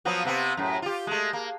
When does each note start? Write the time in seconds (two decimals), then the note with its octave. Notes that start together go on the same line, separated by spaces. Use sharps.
0.05 F3 F#3 B3
0.25 C3 B3 C4
0.57 F#2 A2
0.82 F4 G4
1.07 G#3 A3
1.33 A#3